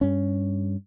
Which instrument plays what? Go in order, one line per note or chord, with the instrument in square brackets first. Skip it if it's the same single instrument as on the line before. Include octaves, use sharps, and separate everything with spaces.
[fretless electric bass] G2 C#4